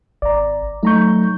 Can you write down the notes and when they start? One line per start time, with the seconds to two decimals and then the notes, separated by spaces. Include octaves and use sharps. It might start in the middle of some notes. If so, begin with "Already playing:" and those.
0.22 G#1 D5 A#5
0.83 F#3 A3 D#4 A#5 C#6 G6